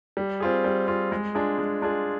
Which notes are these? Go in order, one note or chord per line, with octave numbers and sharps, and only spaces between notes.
G3
C4 F4 G#4
G3
C4 F4 G#4
G#3
D4 F4 G#4
G#3
D4 F4 G#4